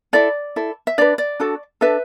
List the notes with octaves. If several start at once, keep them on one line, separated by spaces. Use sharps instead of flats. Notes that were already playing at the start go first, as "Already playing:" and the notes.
E4 A4 D5
E4 A4
E5
D4 B4 D5
D5
D4 F#4 A4
D4 A4 B4 E5